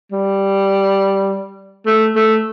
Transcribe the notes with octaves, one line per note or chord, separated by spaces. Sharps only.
G3
A3
A3